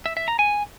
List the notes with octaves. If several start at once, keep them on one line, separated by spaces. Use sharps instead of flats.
E5
E5
A#5
G#5